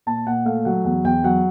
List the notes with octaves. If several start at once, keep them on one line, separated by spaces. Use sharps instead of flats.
A#2 A5
A#2 F#5
A3 F5
F#3 F#5
E2 F#5
E2 G5
F#3 F#5